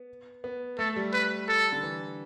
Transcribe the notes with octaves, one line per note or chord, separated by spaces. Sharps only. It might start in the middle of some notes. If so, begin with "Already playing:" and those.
Already playing: B3
B3
A3 A4
G3
B4
A4
D3
E3